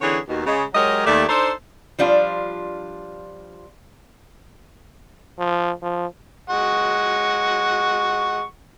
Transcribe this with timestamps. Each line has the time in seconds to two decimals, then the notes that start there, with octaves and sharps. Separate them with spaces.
0.02 D3 E3 C4 C#4 G#4 C#5
0.28 D#2 B2
0.46 C#3 G#3
0.74 F#3 G#3 G4 A#4 C#5 D#5
1.06 D#2 A3 D5
1.29 D4 D#4 A4 C5
1.99 F3 G3 D4 F4
5.39 F3
5.83 F3
6.49 G#3 F#5 C#6